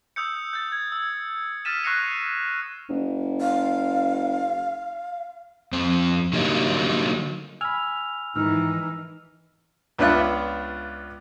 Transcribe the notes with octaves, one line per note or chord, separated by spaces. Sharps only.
D#6 E6 G6 C#7
G6 A6
G#6
E6
D#6 F6 A6 B6 D#7 E7
C#6 F#6 A#6 C7 C#7 F7
F#1
F5
F2 C4
D3 F#3 G3 A#3 D#4
G#5 B5 E6 F6 F7
G#2 D#3 E3 D#4 E6 F6
C#2 B3 D4 F4 E5 F#6